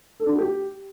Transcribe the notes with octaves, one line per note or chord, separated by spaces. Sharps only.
A4
D4
F#4
G4